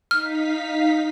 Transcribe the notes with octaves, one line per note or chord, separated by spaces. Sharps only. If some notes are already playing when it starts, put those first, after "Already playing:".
D#4 F5 F6 B6